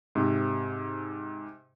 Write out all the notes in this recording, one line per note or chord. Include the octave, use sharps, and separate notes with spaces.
G#2 C3